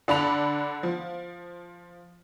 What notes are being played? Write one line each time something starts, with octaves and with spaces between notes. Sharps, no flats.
D3 D4 B5 F7
F3